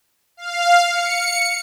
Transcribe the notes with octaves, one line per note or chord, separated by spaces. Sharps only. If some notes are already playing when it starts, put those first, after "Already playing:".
F5
C#7